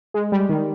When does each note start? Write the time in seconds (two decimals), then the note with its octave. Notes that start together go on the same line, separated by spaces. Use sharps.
0.14 G#3
0.32 G3
0.49 D#3